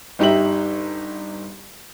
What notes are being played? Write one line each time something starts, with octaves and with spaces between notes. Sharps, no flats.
G1 D#4 G4 E5 F#7